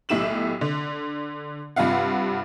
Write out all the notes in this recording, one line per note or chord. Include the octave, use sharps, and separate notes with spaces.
B1 A2 E4 G4 E7 F#7
D3
G2 C3 F4 F5 F#5